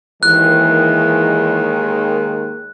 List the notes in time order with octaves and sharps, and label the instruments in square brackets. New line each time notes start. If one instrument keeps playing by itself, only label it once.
[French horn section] D#2 D#3 G#3 [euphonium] E3 [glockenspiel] F#6